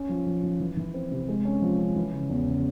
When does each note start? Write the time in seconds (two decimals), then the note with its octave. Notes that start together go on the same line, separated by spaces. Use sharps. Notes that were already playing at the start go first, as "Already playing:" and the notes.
Already playing: C#4
0.09 F3
0.26 F3
0.43 F3
0.60 E3
0.77 E3
0.94 C4
1.11 C3
1.28 G#3
1.45 C#4
1.62 F3
1.79 C#4
1.96 E3
2.13 C#3
2.30 E2
2.47 C#3